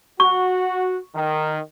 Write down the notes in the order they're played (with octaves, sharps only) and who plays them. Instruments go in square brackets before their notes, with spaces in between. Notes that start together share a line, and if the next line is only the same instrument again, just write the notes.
[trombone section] F#4 [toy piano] C#6
[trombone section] D#3